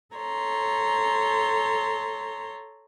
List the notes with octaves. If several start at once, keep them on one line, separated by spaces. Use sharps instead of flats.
A4 C#5 A#5 C6